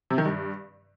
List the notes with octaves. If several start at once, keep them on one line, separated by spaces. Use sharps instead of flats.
C3
D#3
G2